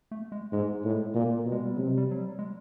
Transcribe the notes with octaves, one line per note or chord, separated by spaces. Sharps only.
A3
G#3
G#2 G#3
A2
A#2
B2
G#3
G3
C3 F#3
G3
F#3
G3
G#3